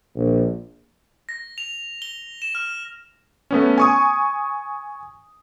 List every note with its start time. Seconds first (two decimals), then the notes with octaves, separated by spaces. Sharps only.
0.15 A#1
1.29 A#6
1.58 F7
2.02 G7
2.42 E7
2.55 F6
3.51 A3 B3 C#4
3.78 G#5 C#6 D#6